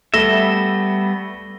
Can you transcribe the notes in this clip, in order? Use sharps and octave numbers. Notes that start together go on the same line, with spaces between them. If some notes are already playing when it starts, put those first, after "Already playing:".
G3 A3 B3 E5 A#6 G7